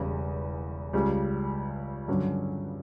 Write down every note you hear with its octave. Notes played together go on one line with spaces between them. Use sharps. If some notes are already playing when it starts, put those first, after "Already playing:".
Already playing: E1 E2 C#3 G3
C#2 C#3 G3
G2 D3 F#3 C#4